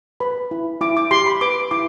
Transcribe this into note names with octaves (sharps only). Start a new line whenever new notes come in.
B4 B5
E4
E4 D6
D6
G4 C6
B5
B4 D6
E4 D6